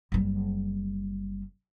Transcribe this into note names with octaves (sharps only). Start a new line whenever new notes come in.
F#1 G3